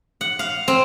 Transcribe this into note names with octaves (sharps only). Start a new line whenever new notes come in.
F#5
F5
C4